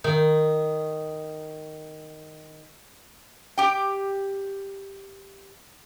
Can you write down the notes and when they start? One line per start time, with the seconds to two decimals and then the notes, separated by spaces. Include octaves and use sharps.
0.04 D#3 D#4
3.58 G4 G5